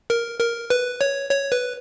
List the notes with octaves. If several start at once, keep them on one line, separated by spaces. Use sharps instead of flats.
A#4
A#4
B4
C#5
C#5
B4